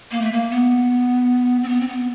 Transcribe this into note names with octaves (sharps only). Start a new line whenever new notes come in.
A#3
A3
A#3
B3
C4
B3
C4
B3